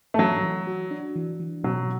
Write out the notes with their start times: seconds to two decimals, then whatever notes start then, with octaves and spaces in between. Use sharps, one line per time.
0.14 A3
0.18 E3 F#3
0.43 E3
0.67 F#4
0.91 D4
1.16 E3
1.40 E3
1.64 B2 F#3